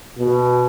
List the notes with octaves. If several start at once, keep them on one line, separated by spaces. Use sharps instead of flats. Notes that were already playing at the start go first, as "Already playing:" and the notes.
B2